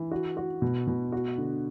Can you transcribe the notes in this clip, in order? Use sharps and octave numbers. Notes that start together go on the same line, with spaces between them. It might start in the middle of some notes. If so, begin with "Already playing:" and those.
Already playing: E3
F#4
F#4
B2
B2
F#4
D3